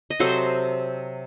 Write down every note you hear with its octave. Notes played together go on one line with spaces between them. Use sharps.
D#5
C3 F#3 C4 A4 C5